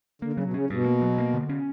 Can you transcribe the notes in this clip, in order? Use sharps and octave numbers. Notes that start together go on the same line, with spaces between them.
D3 A#3
C#3 F#3
B2
C#3 C#4
G2 B2
A#3
F#3
A#3
D3
C#4